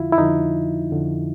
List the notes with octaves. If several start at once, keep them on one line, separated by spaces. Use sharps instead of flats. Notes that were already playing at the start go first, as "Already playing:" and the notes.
Already playing: F2 D3 F3 E4 F4
E4
F2 D3 F3 D#4
F2 D3 F3